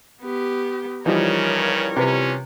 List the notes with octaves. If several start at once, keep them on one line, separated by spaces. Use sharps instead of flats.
B3 G4
C#3 E3 F3 G3 D#4 A#4 C#5
C3 C#4 B4